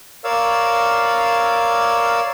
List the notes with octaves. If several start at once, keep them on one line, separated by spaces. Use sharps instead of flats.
A#4 C#5 D5 F5 E6